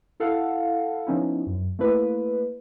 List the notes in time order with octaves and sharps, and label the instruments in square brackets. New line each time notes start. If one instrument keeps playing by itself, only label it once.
[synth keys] E4 A4 F5 F#5
F3 B3 C#4 D#4 E4
F#2
A3 A#3 E4 B4